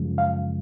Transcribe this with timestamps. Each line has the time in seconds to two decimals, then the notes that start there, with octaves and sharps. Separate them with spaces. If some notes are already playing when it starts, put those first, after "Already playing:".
Already playing: F#2 C#3 F3 G#3
0.18 F5